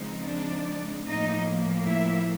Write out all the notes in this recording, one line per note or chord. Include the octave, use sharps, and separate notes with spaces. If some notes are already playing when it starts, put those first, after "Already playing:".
Already playing: C#3 F3 G#3 C4 D#4
D4 D5
A2 F3 A#3 D#4 D#5
E4 E5